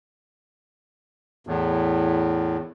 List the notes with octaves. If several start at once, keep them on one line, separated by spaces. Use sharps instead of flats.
E2 A2